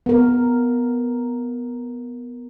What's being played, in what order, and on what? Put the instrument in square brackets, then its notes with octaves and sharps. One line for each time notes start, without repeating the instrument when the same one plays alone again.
[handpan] B3 A#4